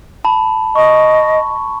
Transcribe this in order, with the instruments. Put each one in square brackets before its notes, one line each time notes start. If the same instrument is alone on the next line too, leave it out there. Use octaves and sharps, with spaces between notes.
[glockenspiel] A5 B5
[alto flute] D#5 [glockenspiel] C#6